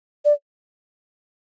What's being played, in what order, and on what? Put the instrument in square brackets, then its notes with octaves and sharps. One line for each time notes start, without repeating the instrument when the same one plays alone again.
[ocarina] D5